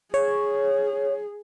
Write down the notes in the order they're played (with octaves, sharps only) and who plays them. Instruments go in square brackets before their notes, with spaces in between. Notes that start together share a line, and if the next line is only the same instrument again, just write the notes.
[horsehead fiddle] G#4 [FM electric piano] C#5